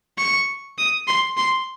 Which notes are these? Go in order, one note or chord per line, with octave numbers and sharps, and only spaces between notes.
C#6
D#6
C6
C6